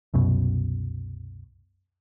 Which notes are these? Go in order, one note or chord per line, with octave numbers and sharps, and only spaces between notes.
C2 F#2 B2